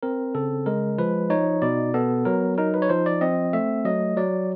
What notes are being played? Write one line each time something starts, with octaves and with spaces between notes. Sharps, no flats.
C4 A#4
C#3 A4
G#3 A#4
F3 B4
D#4 C#5
B2 D5
B3 A4
F#3 A#4
D#4 A#4
B4
C#5
F3 C5
D5
C4 D#5
A3 E5
F#3 D#5
F#3 D5